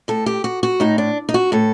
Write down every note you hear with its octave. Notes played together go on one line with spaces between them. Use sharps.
A2 A4
G4
F#4
F#4
A2 D#4
D4
D#4
F#4
A2 A4